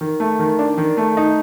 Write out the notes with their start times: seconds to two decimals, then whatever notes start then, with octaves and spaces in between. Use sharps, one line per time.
0.01 D#3
0.20 A3
0.39 D#3
0.59 D4
0.78 D#3
0.97 A3
1.17 D#4